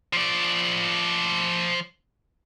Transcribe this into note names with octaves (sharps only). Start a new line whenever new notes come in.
F3 D5